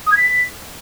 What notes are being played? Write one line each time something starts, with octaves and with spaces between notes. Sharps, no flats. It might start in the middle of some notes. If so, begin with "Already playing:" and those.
D#6
G#6
B6